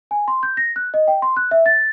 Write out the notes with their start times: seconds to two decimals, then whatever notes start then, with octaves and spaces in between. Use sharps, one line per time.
0.11 G#5
0.28 C6
0.43 G6
0.57 A#6
0.76 F#6
0.94 D#5
1.08 G5
1.22 C6
1.37 F#6
1.51 E5
1.66 A6